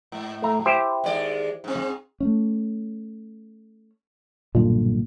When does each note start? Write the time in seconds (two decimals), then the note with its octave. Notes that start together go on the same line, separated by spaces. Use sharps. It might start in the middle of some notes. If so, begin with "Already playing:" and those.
0.12 G#2
0.42 A3 A#5
0.65 E4 G4 C5
1.04 D#2 G#3 D5
1.64 G#2 C4
2.20 A3 C#4
4.55 B1 G2 A#2 D3